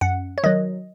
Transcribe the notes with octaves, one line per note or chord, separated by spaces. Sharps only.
F#2 F#5
C#5
D#3 F#3 D#5